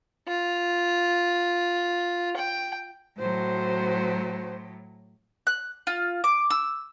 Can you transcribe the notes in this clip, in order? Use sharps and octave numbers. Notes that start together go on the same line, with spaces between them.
F4
G5
A2 F#3 F#4 C5
F#6
F4
D6
E6